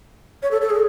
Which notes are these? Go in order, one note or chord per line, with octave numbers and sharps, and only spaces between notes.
C#5
A4
A4
G#4